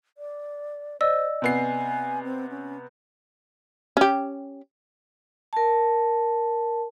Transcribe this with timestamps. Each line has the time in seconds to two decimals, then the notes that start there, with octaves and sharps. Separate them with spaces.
0.18 D5
1.01 C5 D5 D#5 E6
1.42 C3 B3 G#5 C7
2.24 C4
2.50 C#4
3.97 C#4 G4
5.53 A#4 A5